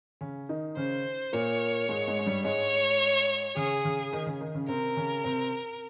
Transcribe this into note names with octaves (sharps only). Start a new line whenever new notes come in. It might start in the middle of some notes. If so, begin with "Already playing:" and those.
C#3 C#4
D#3 D#4
C#3 C#4 C5
A#2 A#3 C#5
G#2 G#3
G#2 G#3
G#3
G2 G3
G#2 G#3 C#5
C#3 C#4 G#4
C#3 C#4
D#3 D#4
C#3 C#4
D#3 D#4
C#3 C#4
C3 C4 A#4
C#3 C#4
C3 C4